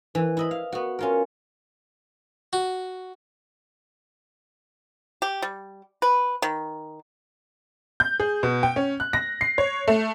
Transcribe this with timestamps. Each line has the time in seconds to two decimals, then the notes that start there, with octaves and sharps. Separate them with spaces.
0.15 E3
0.37 E4 D#5 B5
0.51 F5
0.72 B3 F#4
0.99 C#4 F4 A#4
2.53 F#4
5.22 G4
5.42 G3
6.02 B4
6.42 D#3
8.00 G6
8.20 G#4
8.43 B2
8.63 G5
8.76 C#4
9.00 F#6
9.13 A#6
9.41 C7
9.58 C#5
9.88 A3